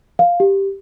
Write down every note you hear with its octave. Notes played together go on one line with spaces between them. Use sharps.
F5
G4